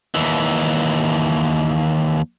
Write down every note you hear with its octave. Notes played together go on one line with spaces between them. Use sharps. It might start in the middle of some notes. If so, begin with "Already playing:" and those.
D#2 E3